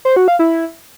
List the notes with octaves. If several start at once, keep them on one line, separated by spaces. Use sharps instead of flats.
C5
F#4
F5
E4